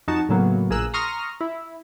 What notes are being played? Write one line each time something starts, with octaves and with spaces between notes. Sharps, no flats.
F2 D#4 F#4 A5
A2 C#3 F#3 A#3 B3
A#1 A#3 G#4 A#4 E6 F#6
A#5 C6 C#6 D#6 F6 A#6
E4